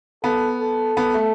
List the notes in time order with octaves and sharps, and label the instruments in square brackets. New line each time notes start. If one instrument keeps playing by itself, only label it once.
[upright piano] B3 [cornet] A4
[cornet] A4
[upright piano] B3
A3